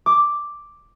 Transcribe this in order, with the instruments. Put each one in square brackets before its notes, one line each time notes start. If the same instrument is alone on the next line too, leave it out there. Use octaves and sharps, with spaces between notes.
[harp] D6